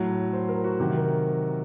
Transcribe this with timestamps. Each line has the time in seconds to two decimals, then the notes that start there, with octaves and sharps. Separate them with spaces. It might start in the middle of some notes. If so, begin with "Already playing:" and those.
Already playing: A2 F#3
0.33 C5
0.49 A#4
0.64 F#4
0.80 C3 D#3 F#3
0.97 A#4